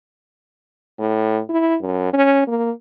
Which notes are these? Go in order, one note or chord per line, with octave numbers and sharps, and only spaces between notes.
A2
E4
F#2
C#4
A#3